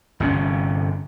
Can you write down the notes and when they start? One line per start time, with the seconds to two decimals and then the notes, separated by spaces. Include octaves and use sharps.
0.20 G1 C3 C4 C#4